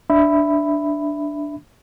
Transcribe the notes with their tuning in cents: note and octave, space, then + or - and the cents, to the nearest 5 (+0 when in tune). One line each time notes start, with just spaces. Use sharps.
D4 +0 E5 +0 B5 +10